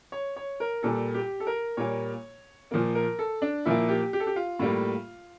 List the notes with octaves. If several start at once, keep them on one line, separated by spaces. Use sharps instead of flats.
C#5
C#5
A#4
A#2 G3 A#3 A4
G4
A4
A#4
A#2 G3 A#3 C#5
A#2 F3 A#3
A#4
A4
D4
A#2 F3 A#3 E4
G4
G4
A4
G4
F4
A2 G3 A#3